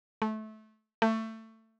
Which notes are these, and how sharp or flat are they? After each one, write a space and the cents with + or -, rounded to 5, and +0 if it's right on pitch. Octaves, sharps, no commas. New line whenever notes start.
A3 -20
A3 +20